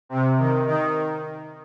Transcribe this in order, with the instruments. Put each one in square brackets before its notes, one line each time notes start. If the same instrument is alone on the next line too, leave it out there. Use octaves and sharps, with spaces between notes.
[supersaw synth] C3
D#3
D#3